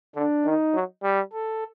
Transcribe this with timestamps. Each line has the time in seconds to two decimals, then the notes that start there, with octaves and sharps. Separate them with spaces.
0.15 D3 D4
0.45 D#3 D#4
0.74 F#3
1.03 G3
1.33 A4